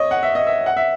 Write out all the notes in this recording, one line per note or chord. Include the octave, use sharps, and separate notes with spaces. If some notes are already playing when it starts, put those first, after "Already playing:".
Already playing: C#5 D#5
F#5
E5
D#5
E5
F#5
E5